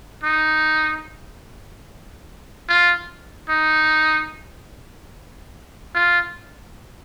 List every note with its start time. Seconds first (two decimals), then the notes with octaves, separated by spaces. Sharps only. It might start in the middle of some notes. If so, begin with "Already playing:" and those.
0.24 D#4
2.69 F4
3.49 D#4
5.95 F4